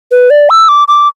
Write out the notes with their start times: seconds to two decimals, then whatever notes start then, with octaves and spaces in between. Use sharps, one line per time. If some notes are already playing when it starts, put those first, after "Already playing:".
0.11 B4
0.30 D5
0.50 E6
0.69 D6
0.88 D6